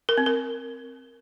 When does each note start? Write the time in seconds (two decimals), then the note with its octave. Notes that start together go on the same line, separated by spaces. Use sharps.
0.09 A#4
0.18 C4
0.26 A#4